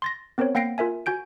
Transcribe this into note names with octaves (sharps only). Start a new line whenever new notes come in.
C6 A6 A#6
B3 C4 A#4 C5 C#5
A#3 F#5 G5 A#6 C7 D7
F4 A#4 E5 G#5
F#4 G#5 G6 D7